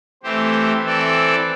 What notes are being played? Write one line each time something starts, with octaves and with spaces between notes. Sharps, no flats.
E3 A3 C4 G4 C5
E3 C4 A4 D5